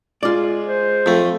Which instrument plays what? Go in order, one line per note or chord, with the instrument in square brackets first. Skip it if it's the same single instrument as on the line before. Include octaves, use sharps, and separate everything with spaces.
[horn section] G#3 [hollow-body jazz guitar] F4 D5
[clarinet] C5
[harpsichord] F2 A3